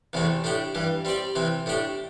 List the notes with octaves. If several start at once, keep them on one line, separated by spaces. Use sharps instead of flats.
E2 C3 E3 A3 C4
A2 A3 D4 G4
G2 E3 G3
G3 C4 G4 D5
C3 E3 C4
A2 A3 D4 G4